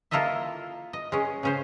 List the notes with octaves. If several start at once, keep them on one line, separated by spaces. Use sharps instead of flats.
A#3 E4 F4 A4 D#5 E5
D#5
G#3 C#4
C#3 C#4 C5